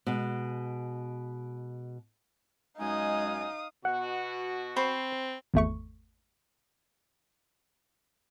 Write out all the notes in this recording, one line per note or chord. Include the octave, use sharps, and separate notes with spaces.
B2 G#3
F#2 G#3 D#4 F5 G#5 D#6
B2 F#4 F#5
C4 C5 B5 C#6
G#1 E2 A3 C#6